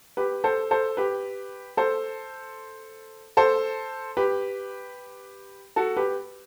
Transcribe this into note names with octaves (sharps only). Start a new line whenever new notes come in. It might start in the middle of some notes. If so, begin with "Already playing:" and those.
G4 B4
A4 C5
A4 C5
G4 B4
A4 C5
A4 C5
G4 B4
F#4 A4
G4 B4